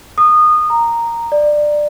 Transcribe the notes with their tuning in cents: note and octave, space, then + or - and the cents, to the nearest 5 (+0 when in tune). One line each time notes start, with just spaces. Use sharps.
D#6 -25
A#5 -5
D5 +15